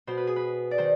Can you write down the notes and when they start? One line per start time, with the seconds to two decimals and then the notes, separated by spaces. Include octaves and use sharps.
0.07 B2 C5
0.17 B4
0.27 G#4
0.36 B4
0.71 D5
0.78 D#3 C5